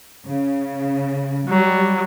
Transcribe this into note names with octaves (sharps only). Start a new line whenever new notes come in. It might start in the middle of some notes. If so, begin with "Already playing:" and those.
C#3
F#3 G3